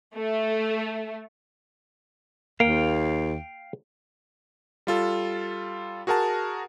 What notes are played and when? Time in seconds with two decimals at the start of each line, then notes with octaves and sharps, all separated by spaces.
0.16 A3
2.60 D#2 A#3 F5 G5
4.87 G3 F4 A4
6.07 F#4 G#4 A#4 F#5 A5